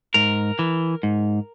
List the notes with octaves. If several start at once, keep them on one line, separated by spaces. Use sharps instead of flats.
G#2 A#4
E3
G#2